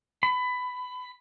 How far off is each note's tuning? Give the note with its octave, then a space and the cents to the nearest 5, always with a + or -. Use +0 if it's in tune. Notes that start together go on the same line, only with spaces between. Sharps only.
B5 +20